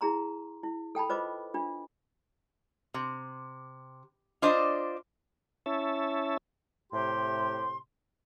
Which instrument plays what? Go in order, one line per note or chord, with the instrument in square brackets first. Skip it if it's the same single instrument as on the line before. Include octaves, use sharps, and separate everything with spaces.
[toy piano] E4 G#4 A#5 C6
E4
A4 G5 A5 B5
F4 B4 C5 D#5 D6
D4 F4
[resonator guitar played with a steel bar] C3
D4 F4 C5 D5 D#5
[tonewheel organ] C#4 E4 C#5 E5 A5
[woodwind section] A2 C3 G4 C6